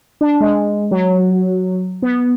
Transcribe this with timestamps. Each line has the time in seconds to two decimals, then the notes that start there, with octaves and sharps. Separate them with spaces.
0.21 D4
0.41 G#3
0.91 F#3
2.02 B3